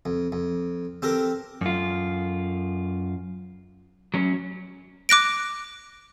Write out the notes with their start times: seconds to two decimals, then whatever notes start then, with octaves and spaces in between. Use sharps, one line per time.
0.05 F2
0.32 F2
1.02 C4 G4 A4 A#4
1.61 F#2 F4
4.14 F#3 C#4
5.09 D6 F#6 A#6 D7